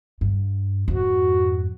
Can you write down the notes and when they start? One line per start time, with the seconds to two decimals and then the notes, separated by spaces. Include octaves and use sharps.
0.21 G2
0.88 F2 G#2 F#4